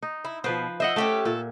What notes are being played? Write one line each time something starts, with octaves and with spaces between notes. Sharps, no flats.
D#4
E4
B2 F3 B4 C5
C5 D#5 E5 F#5
A3 C#4 G4 A4 E5
A#2 A4